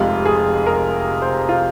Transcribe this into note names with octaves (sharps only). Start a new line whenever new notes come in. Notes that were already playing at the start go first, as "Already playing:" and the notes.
Already playing: F1 F2 C3 G#3 F4
G#4
A#4
C5
F4